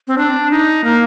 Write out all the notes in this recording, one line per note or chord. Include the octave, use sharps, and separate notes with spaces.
C4
D4
D#4
A#3